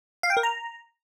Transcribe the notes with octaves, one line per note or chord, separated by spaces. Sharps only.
F5
G5
A#4
A#5